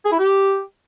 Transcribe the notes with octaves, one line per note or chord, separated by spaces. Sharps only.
G#4
E4
G4